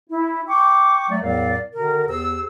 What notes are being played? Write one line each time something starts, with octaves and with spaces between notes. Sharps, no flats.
E4
G5 C#6 D6
F#3 A3 D5
E2 A2 F#3 A#4 D5 F5
B2 D3 D#3 A#4
E2 G4 G#4 C5 E6